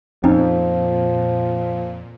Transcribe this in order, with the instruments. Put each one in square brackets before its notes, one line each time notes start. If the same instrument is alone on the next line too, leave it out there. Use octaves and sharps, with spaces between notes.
[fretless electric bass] F2 [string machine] A#2 [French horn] F3 [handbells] C4 C#4 D#4